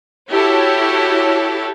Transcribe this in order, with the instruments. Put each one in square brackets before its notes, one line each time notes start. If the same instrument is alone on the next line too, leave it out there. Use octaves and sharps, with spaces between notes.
[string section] E4 F#4 G4 A4 C#5